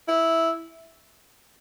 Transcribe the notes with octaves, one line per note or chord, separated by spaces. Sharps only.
E4